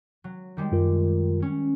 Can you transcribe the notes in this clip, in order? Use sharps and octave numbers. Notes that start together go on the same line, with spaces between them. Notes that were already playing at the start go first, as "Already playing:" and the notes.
F#3
D#3 G3 G#3
F#2 F4 A#4
C#4